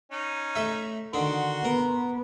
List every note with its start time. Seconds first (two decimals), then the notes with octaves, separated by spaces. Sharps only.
0.12 C#4 D#4
0.55 A3 E5
1.13 D3 D#3 F#4 C6
1.64 B3 A#4